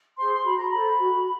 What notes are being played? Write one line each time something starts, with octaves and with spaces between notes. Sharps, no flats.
G#4 C5 C6
C6
F#4 B5
A#5
A4 C5 B5
F#4